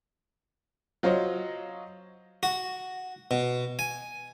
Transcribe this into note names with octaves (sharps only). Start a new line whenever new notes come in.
F#3 F4 C5 C#5 D#5
F#4
B2
G#5